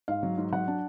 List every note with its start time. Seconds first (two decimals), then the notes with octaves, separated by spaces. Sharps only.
0.08 G#2 F5
0.23 F#3
0.38 G#2
0.52 F#3 F#5
0.68 D4